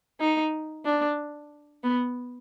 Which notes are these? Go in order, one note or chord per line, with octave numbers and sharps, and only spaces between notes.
D#4
D4
B3